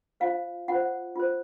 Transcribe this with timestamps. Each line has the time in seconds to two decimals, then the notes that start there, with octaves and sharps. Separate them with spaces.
0.20 F4 C5 F5
0.68 F4 C5 F#5
1.16 F4 C5